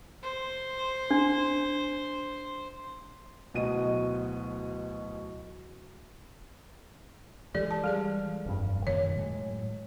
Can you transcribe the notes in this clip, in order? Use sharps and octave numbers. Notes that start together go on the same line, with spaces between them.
C5
D4
D1 B2 F#4 D#5 D#7
E3 G#3 G4 A4 D5
A5
G3 G#4 D5
F1 G2
F#2 A#2 D#3 C#5
A2 F#3 G#3